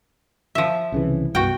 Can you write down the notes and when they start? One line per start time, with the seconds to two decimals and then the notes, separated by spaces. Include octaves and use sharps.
0.55 F3 E5
0.92 C2 C#3 E3
1.35 C2 G2 B3 F#4 G5